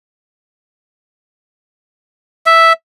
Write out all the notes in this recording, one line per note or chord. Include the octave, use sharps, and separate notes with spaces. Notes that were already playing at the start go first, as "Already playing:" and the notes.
E5